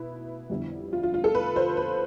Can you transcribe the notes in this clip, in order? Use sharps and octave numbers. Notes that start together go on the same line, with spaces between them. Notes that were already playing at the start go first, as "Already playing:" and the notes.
Already playing: B2 E4 B4
F2 D3 G3 B3
F4
F4
F4
A4
B4
C5
B4